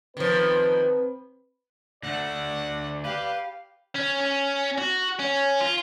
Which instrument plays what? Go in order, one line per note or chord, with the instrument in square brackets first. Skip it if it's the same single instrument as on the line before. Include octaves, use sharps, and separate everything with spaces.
[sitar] D#3 F3 [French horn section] C4 B4
[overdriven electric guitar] D2 A3 [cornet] D5 [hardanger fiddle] F#5
[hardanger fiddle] G4 [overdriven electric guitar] B4 [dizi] F5
[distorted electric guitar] C#4
C#4
F#4
C#4
F4